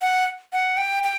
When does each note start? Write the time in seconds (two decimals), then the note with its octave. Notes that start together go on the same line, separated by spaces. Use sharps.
0.02 F#5
0.53 F#5
0.77 G5
1.03 G5